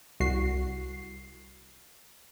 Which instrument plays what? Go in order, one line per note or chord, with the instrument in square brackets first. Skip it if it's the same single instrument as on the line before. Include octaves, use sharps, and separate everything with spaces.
[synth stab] C2 F#4 C7